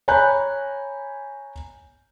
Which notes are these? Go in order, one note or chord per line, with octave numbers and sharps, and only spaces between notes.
C#5 G#5 A#5 B5 F#6 G6